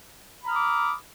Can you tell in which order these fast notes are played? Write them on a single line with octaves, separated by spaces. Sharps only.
B5 A#5 F6 D#6 D6